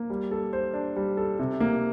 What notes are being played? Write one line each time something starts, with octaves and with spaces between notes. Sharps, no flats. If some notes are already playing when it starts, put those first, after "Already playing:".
Already playing: A#3
G3
A4
C5
D4
G3
A4
C3
A#3